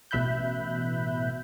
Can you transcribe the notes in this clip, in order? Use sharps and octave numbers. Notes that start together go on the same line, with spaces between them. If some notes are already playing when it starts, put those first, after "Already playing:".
A1 B2 E5 B5 F#6 G6